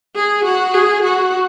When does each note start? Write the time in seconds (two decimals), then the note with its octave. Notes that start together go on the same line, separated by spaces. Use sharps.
0.15 G#4
0.45 F#4
0.74 G#4
1.03 F#4